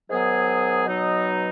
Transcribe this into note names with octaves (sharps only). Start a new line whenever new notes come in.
G#2 D#3 F#3 B3 G#4
B2 F#3 D#4